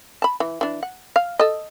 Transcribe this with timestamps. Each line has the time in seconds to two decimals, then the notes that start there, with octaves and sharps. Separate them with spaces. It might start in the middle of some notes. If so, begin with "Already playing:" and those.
0.22 A5 B5
0.40 E3
0.61 E3 D4
0.83 F#5
1.16 F5
1.39 A4 D#5